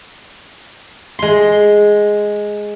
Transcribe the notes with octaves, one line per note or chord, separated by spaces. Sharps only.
G#3 C6